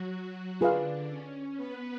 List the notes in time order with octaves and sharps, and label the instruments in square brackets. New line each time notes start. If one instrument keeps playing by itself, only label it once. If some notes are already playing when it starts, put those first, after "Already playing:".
Already playing: [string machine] F#3 F#4
[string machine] D3 D4 [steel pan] F4 G#4 B4 F5
[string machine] C#4
B3 B4